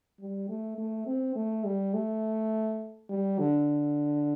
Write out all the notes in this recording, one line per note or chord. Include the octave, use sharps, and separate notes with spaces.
G3
A3
A3
C4
A3
G3
A3
G3
D3